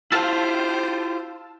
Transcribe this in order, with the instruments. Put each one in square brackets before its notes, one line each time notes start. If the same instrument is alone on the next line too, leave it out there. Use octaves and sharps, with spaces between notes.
[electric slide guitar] E4 F4 [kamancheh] G4 C5 [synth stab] F5 A5 E6